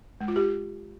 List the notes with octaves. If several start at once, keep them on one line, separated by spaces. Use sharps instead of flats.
G#3
F4
G4